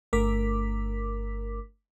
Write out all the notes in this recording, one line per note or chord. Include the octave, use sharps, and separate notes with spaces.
G1 A3 A#4 D6 B6